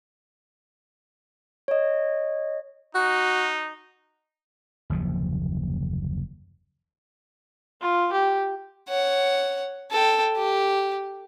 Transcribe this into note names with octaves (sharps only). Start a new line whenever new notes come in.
C#5 D#5
D#4 F#4
F#1 D#2 C3 F3
F4
G4
C#5 F#5
A4 G5
G4